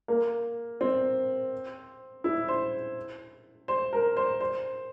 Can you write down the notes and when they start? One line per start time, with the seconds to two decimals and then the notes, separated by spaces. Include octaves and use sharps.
0.08 A#3
0.81 C4
2.24 E4
2.48 C5
3.68 C5
3.93 A#4
4.17 C5
4.40 C5